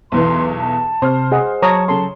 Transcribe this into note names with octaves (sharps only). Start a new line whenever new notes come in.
B1 E2 E3 C6
A5
C3 C5 F6
G#4 D#5 F#5
F#3 C#5 A5 A#5 D#6
C#3 A4 A5 C6